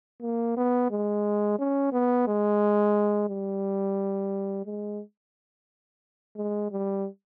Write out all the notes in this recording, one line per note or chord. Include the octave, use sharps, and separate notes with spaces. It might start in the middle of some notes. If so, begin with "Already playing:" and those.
A#3
B3
G#3
C#4
B3
G#3
G3
G#3
G#3
G3